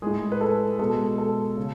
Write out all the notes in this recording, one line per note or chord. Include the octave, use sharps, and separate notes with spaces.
A2 G#3 G#4
B4
A4
B2 G#3 A4
A4
C#3